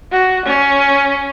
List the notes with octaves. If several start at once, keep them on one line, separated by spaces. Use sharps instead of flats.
F#4
C#4